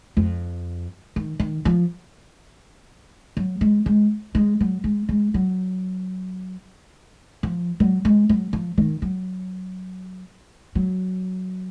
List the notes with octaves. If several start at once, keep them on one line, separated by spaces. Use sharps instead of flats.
F2
D#3
D#3
F3
F#3
G#3
G#3
G#3
F#3
G#3
G#3
F#3
F3
F#3
G#3
F#3
F3
D#3
F#3
F#3